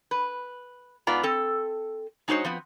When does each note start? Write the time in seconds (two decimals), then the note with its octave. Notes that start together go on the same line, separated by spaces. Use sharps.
0.11 B4
1.07 G#2 B3 F4 D5 A#5
1.23 C4 A4
2.28 G#3 D#4 F#4 A#4 C5 C#5
2.44 F3 B3 C4